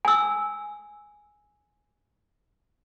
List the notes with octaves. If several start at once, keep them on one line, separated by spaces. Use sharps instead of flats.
G#5 E6